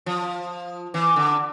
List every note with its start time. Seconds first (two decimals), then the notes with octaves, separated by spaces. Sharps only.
0.06 F3
0.94 E3
1.16 D3